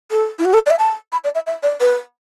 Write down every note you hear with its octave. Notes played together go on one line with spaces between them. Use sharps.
A4
E4
F#4
A4
D5
E5
A5
B5
D5
E5
E5
D5
B4